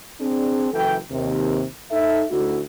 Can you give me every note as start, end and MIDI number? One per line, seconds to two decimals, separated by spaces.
0.20 0.68 60
0.20 0.68 62
0.20 0.68 68
0.73 0.98 30
0.73 0.98 52
0.73 0.98 69
0.73 0.98 79
1.11 1.64 39
1.11 1.64 48
1.91 2.24 63
1.91 2.24 69
1.91 2.24 76
2.30 2.60 38
2.30 2.60 57
2.30 2.60 63
2.30 2.60 64
2.30 2.60 66